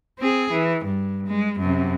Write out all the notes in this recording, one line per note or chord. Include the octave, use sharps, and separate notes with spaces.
C4 G#4
E3
G2
G#3
F#2 C3